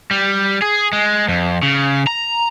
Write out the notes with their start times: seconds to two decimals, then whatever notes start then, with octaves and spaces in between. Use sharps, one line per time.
0.11 G3
0.62 G#4
0.93 G#3
1.28 F2
1.63 C#3
2.07 A#5